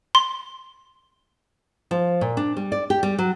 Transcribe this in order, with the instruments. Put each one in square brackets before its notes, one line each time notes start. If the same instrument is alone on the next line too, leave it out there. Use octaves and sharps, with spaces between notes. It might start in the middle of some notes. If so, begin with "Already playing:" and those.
[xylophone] C6
[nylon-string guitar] F3
A#2
D4
G3
D5
G4
G3
F#3